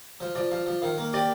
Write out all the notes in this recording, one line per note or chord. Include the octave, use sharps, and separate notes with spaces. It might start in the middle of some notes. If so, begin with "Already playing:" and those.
F3 C5
F3 D5
F3 F5
F3
D#3 F5
A#3
G4 D5